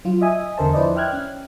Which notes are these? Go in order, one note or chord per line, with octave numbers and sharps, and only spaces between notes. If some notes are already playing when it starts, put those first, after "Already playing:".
F#3 F4
D#5 E5 G#5 D#6
E2 D3 A#4 C5 A5
F3 E4 B4 C5 D5 D#5
E5 G5 F6 F#6 G#6
C#4